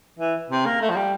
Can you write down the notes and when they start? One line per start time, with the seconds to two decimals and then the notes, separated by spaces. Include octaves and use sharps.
0.19 E3
0.50 C3
0.65 A#3
0.81 A3
0.89 F3
0.96 G3